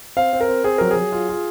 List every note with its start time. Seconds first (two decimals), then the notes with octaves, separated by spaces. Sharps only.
0.17 C4 F5
0.33 C4
0.41 A#4
0.48 C4
0.64 C4 G#4
0.78 F#3 A#4
0.91 G#4
0.96 F#3
1.12 F4
1.29 F4